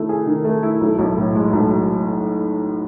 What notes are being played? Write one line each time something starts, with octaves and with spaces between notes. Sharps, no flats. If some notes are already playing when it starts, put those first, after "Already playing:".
Already playing: D#3 A3 E4
G#4
D#3
A3
E4
B1
B1
A2
G#3
B1